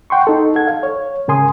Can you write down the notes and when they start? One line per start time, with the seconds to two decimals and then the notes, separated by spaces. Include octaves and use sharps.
0.10 F#5 G5 C6 C#6
0.27 D#4 A4
0.56 A4 F#5 G#6
0.68 F5
0.83 C#5
1.28 G#2 C#3 A#4 G#5 C6 D#6